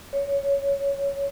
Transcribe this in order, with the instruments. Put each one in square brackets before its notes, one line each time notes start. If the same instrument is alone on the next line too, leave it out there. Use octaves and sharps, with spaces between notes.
[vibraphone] C#5